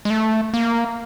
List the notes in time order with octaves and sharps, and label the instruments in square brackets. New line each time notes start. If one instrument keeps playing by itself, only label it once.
[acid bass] G#3
A3
A#3